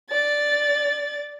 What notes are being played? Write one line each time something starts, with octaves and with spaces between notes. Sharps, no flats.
D5 A6